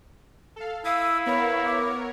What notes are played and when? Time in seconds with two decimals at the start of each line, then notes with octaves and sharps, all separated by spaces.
0.56 A4 F5
0.85 E4 F5 D#6 E6
1.26 B3 A#4 C#5 B5
1.65 D6